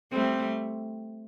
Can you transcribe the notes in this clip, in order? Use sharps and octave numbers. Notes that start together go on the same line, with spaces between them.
G3 A3 C4